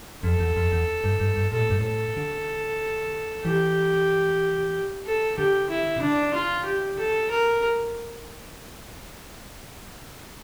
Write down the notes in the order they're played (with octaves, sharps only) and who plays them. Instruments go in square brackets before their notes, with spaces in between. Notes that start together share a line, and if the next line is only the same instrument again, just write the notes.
[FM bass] F2 [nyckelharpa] A4
[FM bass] E2
F2
E2
G2
G2
G2
[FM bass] A#2 [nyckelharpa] A4
[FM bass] A2
G2
[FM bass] A2 [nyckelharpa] A4
[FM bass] D3
[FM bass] E3 [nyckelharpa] G4
[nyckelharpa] A4
[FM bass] D3 [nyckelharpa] G4
[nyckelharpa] E4
[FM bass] C3
[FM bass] D3 [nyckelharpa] D4
[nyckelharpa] F4
G4
A4
A#4